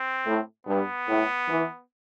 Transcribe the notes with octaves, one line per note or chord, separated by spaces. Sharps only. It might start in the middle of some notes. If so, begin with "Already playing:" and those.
Already playing: C4
A2
G2 B3
A2
E3